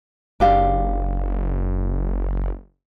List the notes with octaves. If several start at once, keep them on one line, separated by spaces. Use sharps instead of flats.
F#1 D4 G4 F5